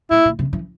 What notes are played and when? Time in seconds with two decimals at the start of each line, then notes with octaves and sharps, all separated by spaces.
0.11 A2 E4
0.25 A#2
0.39 C3
0.53 E3